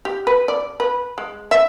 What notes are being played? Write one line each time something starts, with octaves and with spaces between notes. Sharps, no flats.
G4
B4
D5
B4
G#3
E5